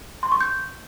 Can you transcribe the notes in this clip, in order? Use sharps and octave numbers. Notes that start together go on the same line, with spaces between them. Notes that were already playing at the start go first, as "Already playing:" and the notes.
C6
C#6
G6